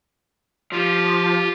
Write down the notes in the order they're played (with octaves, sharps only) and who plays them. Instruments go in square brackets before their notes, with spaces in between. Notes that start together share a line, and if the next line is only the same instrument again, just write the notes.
[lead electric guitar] F3 [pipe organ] F4 G4